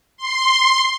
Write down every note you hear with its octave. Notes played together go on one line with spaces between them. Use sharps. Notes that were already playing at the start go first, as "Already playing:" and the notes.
C6